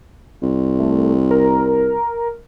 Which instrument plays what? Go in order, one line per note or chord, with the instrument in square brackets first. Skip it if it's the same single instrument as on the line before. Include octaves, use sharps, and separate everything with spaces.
[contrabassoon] C2
[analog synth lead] A3
A#4